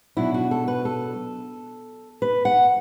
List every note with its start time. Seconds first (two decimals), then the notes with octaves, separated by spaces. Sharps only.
0.17 B2 F#3 D4 E4
0.34 F#4
0.51 A4
0.68 B4
0.85 A4
2.22 B4
2.45 F#5